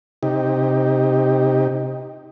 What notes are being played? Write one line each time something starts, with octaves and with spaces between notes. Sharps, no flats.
C3 D#4 G4